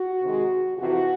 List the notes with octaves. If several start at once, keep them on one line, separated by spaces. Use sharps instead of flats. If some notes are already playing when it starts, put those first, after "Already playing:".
Already playing: F#4
C3 D#3 G#3
F2 C3 E3 F#4